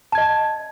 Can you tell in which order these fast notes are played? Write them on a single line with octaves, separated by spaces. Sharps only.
A5 G#6 D#5